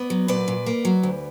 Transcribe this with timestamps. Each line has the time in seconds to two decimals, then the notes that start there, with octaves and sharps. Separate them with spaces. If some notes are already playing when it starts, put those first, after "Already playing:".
Already playing: B3 D5
0.10 F#3
0.28 A#2 B4 D5
0.48 A#2
0.66 A#3
0.85 F#3
1.03 D2